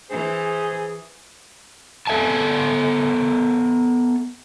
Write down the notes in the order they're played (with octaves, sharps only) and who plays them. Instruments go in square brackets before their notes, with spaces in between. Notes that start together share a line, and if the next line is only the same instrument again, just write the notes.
[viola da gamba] E3 [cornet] G#4 [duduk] C5
[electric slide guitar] B3 A4 E5 G#5 A5